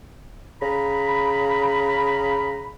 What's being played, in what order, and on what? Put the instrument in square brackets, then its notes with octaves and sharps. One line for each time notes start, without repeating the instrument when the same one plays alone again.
[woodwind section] C#3 A#5 B5